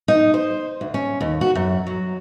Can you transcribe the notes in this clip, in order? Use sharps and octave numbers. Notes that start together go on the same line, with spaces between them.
D#4
C5
D2
C#4
D#2
F#4
F#2
F#3